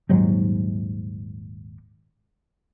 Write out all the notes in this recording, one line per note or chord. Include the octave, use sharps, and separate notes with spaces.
D#1 D#2 G#2 F#3